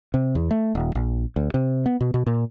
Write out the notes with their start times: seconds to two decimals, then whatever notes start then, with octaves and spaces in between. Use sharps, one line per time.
0.14 C3
0.35 E2
0.51 A3
0.75 D#1
0.95 A#1
1.36 D2
1.54 C3
1.86 B3
2.01 B2
2.14 B2
2.26 A#2